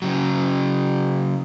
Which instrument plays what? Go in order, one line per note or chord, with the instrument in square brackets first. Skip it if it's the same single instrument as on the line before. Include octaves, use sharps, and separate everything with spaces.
[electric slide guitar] C#3 F#3